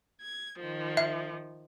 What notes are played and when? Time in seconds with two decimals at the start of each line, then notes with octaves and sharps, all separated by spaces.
0.20 G#6
0.59 D#3 F3
0.97 E5